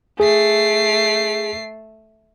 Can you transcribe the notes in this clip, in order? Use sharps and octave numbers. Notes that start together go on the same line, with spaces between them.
A3 G#4 C7